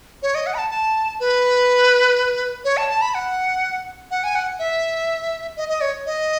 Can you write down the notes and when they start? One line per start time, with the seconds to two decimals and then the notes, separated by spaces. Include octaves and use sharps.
0.23 C#5
0.35 D#5
0.47 F#5
0.54 B5
0.58 A5
0.70 A5
1.20 B4
2.65 C#5
2.77 A5
2.89 A5
3.02 B5
3.14 F#5
4.11 F#5
4.24 G#5
4.35 F#5
4.59 E5
5.57 D#5
5.69 D#5
5.81 C#5
6.06 D#5